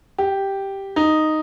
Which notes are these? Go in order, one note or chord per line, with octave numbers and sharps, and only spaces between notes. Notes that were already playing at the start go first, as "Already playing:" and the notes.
G4
D#4